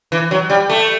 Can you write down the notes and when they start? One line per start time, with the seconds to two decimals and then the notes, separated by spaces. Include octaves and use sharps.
0.12 E3
0.31 F#3
0.50 G3
0.70 A3